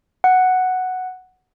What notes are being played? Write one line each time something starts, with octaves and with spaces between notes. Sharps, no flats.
F#5